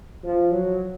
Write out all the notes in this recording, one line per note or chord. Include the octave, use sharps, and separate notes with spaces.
F3
F#3